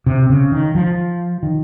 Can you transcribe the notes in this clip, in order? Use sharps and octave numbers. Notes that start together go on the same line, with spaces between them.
C3
C#3
D#3
F3
D#3